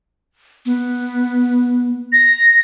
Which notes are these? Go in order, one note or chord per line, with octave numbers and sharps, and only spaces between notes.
B3
A#6